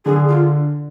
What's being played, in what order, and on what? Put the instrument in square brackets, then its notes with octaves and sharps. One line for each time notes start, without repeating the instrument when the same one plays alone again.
[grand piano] D3 [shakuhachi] G#4
[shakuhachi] F4